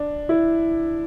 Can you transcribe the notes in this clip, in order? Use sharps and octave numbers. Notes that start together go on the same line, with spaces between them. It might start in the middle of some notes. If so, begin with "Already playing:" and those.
Already playing: D4
E4